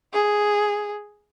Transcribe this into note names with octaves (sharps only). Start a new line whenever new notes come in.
G#4